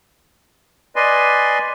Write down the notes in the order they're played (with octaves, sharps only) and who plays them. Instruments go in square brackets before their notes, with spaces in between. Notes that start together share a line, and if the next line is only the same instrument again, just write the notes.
[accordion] B4 D5 D#5 G#5 C6